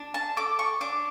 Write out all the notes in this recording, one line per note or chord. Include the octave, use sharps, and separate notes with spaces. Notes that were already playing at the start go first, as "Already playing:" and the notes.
Already playing: D4
A5
A4 D6
C#6
D4 D6